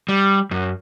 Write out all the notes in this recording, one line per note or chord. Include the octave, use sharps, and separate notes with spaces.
G3
F#2